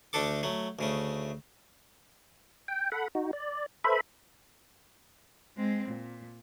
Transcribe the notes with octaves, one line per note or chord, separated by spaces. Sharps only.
D2 A3 D4 A4 D6
F#3 A3
D2 C#3 A3
G5
A4 F#5 B5
D#4 F#4
D5
A4 B4 C5 E5 B5
G#3 C4
A#2